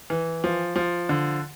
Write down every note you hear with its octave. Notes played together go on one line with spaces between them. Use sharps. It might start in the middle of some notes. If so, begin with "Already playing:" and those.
E3
F3
F3
D3